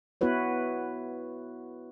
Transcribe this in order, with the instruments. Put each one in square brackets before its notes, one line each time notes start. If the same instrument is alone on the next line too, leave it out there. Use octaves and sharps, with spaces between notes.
[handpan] B3 E4 F#4 B4 C#5